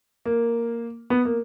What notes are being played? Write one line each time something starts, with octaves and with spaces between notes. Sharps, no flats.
A#3
B3
A#3